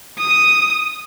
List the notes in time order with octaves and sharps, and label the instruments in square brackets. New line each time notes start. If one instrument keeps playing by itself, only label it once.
[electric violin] D#6